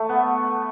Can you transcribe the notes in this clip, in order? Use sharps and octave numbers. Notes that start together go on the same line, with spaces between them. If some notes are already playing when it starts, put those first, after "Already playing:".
Already playing: A3
B3